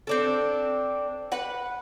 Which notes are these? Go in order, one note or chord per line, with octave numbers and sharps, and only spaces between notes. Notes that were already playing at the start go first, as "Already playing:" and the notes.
C4 D4 A4
B4 F#5